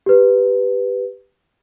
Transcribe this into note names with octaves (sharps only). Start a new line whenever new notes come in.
G4 B4